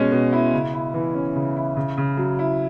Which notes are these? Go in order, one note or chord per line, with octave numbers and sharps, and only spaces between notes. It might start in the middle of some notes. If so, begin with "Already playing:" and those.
Already playing: B2 G#3 C#4
B2
E4
C#3
E4
E3
C#4
C#3
E4
C#3
C#3
F#3
E4